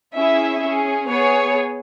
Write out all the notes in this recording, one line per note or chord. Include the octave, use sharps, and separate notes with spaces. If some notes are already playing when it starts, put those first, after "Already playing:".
C#4 E4 G#4 E5
C#4 G#4
B3 G#4 C#5